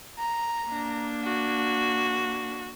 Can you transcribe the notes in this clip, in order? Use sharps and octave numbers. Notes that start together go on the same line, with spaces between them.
A#5
A#3 D4
F#4